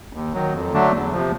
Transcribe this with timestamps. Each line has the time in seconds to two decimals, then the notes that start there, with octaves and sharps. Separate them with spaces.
0.13 D#2
0.34 D#3 F#3
0.53 F2
0.72 D3 F#3 A3 D4
0.93 E2
1.12 C3 F3